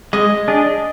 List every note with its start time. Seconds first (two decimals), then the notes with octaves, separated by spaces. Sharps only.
0.13 G#3 D#5
0.48 D4 G#4